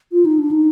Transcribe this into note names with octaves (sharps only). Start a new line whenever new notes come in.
F4
D#4
D4
D#4